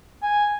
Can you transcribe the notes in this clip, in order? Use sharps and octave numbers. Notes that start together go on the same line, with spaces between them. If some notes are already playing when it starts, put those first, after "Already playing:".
G#5